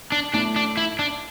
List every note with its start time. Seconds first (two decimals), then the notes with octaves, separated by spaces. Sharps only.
0.12 D4
0.33 A2 A3 D4
0.56 D4
0.77 E4
0.99 D4